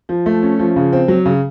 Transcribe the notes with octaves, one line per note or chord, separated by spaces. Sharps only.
F3
A3
C#4
F3
C#3
C4
F#3
C#3